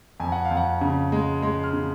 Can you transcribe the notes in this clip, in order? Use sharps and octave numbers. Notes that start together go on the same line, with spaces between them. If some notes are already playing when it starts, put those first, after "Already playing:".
F2 G#5
F#5
F5
F2
F#5
C#3
G#3
G#3 C6
F6
C#3